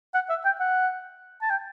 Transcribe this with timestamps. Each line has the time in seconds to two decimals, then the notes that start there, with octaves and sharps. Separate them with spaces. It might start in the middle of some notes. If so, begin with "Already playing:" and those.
0.14 F#5
0.30 E5
0.45 G5
0.60 F#5
1.42 A5
1.50 G5